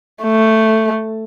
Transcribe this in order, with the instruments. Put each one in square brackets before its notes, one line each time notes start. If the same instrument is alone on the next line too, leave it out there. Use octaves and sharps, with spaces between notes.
[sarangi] A3